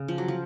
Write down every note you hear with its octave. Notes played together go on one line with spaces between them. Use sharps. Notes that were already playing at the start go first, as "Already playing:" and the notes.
Already playing: C#3
F3
F#3
F3